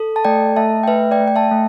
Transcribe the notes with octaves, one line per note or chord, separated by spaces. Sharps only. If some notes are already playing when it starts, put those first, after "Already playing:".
Already playing: A4
A5
A3 D5 G5
A3 E5 A5
G5
A3 B4 E5
D5 G5
A3
G5
E5 A5
A3